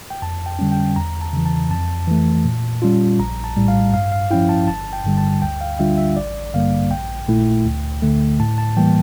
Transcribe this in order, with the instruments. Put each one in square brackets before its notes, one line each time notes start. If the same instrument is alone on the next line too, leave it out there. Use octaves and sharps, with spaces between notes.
[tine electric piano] G5
F2 A5
G5
D3 G3 C#4
G5
E2 A#5
A5
C#3 E3
A5
F2 A5
E3 A3
A#2
G3 C#4 F4
A#1 A#5
A5
A2 G3
F5
G2 F5
F5
F3 C#4 E4 G5
A5
G1 A5
G5
G2 D3 G3
A5
D2 G5
F5
D3 G3 D4 F4 E5
E5
A1 D5
G2 D3 G3 A#3 F5
A#1 G5
A#2 A3 E4
D2
D3 A3
A2 A5
A5
E3 G3 A#3 G5